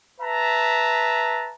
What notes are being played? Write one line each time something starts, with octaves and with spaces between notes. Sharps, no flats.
B4 E5 A5 A#5